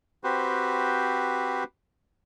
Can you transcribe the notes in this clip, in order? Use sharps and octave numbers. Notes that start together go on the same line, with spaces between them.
C4 F#4 G4 B4 C5